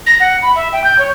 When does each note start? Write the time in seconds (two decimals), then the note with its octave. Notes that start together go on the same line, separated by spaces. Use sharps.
0.07 A#6
0.20 F#5
0.42 B5
0.56 E5
0.73 G5
0.84 G6
0.99 C#5